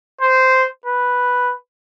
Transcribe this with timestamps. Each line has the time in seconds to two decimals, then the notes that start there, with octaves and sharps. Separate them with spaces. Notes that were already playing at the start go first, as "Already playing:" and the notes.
0.22 C5
0.86 B4